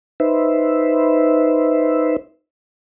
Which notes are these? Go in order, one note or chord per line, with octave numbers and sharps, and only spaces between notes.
D#4 B4 C5 E5